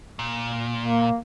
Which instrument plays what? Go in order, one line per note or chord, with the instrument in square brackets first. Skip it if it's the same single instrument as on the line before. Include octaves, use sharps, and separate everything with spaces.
[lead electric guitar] A#2
[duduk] A#3